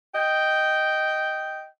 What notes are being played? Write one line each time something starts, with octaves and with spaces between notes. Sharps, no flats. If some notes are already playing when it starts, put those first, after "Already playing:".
D#5 G5